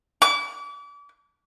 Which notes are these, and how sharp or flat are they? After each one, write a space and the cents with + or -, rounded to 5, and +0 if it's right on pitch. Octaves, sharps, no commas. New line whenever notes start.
D6 -35